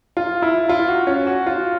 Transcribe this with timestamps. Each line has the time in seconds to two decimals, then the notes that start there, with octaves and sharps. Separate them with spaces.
0.17 F4
0.42 E4
0.69 F4
0.88 F#4
1.07 C#4
1.27 F#4
1.47 F4